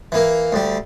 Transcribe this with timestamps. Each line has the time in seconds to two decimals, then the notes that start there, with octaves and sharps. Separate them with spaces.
0.12 E3 A#3
0.52 D2 G3